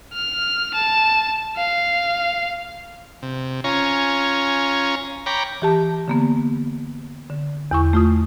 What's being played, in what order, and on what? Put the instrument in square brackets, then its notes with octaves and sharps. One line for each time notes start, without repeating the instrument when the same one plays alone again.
[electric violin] F6
A5
F5
[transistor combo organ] C3
C#4 F4 C#5 G#5 A#5
C#5 G5 A#5 B5 D6
[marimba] E3 G4 A5
D3 A#3 B3
D3
E2 E4 C#6
A3 F4 D#6